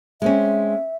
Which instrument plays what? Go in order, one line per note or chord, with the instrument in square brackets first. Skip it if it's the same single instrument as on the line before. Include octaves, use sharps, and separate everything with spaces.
[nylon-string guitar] G#3 C4 C#4 [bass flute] E5